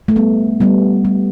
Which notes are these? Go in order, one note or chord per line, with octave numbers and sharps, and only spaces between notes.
A3
G3 B3
G3 B3
G3